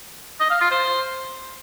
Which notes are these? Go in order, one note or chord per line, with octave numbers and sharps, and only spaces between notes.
D#5
F5
F4
C5